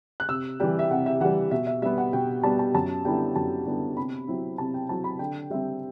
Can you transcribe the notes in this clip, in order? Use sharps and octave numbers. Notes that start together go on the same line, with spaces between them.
F#6
C3 E6
E3 G3 G5
E5
C3 F#5
E5
E3 G3 F#5
B2 E5
E5
G3 B3 E5
F#5
B2 G5
G3 B3 A5
A5
F#2 A5
D3 G3 B3 E4 G5
F#2 A5
D3 G3 B3 E4
C3 B5
F#3 C4 E4
C3 A5
G5
F#3 C4 E4 A5
B5
D3 G5
G3 C4 E5